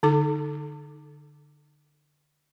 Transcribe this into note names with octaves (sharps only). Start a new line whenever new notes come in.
D3 D#4 A4 D6